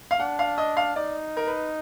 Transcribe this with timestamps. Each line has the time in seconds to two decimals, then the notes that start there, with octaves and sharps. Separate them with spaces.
0.11 F5
0.20 D4 F#5
0.39 F5
0.58 D#5
0.77 F5
0.96 D#4 D5
1.37 A#4
1.47 B4